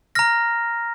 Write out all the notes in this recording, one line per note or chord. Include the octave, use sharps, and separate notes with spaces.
A#5 F6 A#6